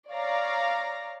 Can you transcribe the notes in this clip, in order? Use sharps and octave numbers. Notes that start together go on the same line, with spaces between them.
C#5 D5 F5 A#5 A#6